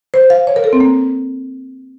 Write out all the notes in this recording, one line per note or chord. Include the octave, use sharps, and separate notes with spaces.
C5
F5
C#5
A#4
A4
C4
A#3